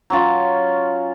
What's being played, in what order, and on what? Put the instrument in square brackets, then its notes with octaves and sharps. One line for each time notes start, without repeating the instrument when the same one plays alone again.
[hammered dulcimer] F#3 C#4 F4